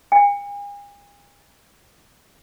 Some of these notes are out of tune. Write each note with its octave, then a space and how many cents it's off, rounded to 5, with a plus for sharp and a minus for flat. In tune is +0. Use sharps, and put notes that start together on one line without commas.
G#5 -40